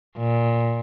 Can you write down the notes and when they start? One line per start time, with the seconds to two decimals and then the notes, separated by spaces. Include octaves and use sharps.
0.18 A#2